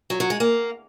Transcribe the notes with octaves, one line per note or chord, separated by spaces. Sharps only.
F#3
F#3
G#3
A#3